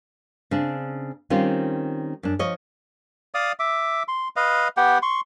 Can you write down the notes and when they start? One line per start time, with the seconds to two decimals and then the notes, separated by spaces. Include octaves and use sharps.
0.51 C#3 C4 D4
1.30 D#3 G3 C4 C#4 F4
2.23 F#2 D4
2.39 F3 C#5 D#5
3.34 D5 F5 D#6
3.60 E5 D6
4.08 C6
4.36 B4 D#5 F5
4.77 B3 G4 F#5 G5
5.02 C6 C#6